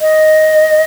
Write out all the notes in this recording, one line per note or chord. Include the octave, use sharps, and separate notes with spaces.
D#5